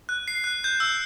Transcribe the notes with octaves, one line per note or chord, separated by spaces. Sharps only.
F#6
C7
F#6
G6
E6